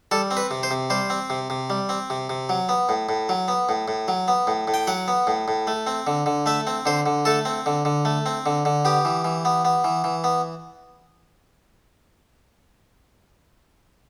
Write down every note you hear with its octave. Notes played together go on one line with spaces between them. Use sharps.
G3 A4
C4
B4
C3
C5
C3
G3 C5
C4
C3
C3
G3
C4
C3
C3
F#3
B3
A2
A2
F#3
B3
A2
A2
F#3
B3
A2
A2
G5
F#3 F#5
B3
A2
A2
A3
C4
D3
D3
A3 E5
C4
D3 C5
D3
A3 A4
C4
D3
D3
A3
C4
D3
D3
B3 G4
E3
E3
B3
B3
E3
E3
B3